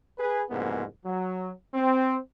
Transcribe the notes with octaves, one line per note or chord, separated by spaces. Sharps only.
G#4 B4
C2 F2 G#2 C#3 A#3 B3
F#3
C4